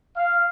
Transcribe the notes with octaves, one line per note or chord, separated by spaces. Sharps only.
F5